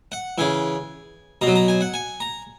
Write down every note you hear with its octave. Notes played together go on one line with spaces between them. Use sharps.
F#5
C#3 E3 G#5
B2 A#5
F#3
A#5
G#5
F#5
G#5
A#5